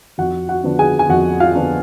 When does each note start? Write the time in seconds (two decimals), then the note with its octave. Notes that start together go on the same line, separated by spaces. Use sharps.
0.18 F2 F#4 F#5
0.49 F#4 F#5
0.64 D3 F3 B3 D4
0.79 G#4 G#5
0.99 G#5
1.09 F2 F#4 F#5
1.40 F4 F5
1.55 D3 F3 B3 D4